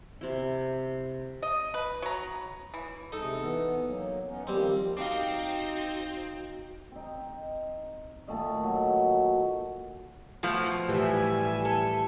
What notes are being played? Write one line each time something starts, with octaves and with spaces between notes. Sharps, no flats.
C3 E4
D#5
B4
F#3 A#5
E3
C3 G#3 D#4 A4
E3 B3
F#3 A#3
B3 C#4 D#4
D#3 F3 G3 A#3 C4
C4 D#4 F#4 F5 G5 D6
C4 D#4
A#2 D#3 A3 D#5
F#3
B2 F3 A3
A2 E3 G3 G4 E5 G#5
A4